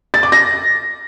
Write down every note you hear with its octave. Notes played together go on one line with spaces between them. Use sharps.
A6
D6
A#6